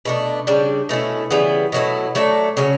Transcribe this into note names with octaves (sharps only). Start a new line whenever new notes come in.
B2 A3 D4
C#3 G3 D4
B2 A3 C#4 E4
C#3 E3 G3 B3
B2 F#3 A3 E4
F#3 A3 D4 A4
C#3 F#3 C#4